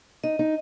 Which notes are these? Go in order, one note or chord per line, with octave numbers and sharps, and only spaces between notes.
D#4 D#5
D#4